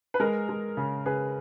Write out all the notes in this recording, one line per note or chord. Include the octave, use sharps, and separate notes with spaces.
B4
G#3 A#4
G#3
C#3
C#3 G#4 B4